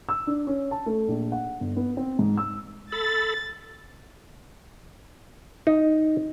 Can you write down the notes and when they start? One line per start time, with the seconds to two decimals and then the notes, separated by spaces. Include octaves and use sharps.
0.09 E6
0.27 D4
0.47 C#4
0.71 A5
0.86 A3
1.08 A#1
1.32 F#5
1.60 G1
1.77 B3
1.97 C4
2.19 G#2
2.37 E6
2.92 A4 B5 A6
5.67 D#4